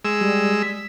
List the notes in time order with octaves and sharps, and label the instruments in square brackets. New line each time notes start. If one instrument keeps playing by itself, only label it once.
[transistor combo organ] G#3 E6
[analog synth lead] G3
B6